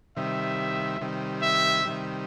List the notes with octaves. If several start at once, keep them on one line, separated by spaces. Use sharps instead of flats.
C3 D#3 G3 E5
C3 D#3 G3
E5
C3 D#3 G3